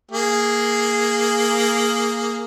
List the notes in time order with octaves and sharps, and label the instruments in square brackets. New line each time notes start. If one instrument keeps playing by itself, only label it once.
[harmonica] A#3 G#4